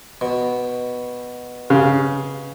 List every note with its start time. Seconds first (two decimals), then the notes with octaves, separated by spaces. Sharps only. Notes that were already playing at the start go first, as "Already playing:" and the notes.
0.21 B2
1.70 C#3